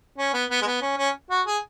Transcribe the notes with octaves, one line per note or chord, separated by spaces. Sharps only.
C#4
B3
B3
G#3
B3
C#4
C#4
F#4
G#4